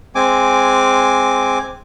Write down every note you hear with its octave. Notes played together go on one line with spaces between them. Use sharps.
G#3 C4 G#5 D6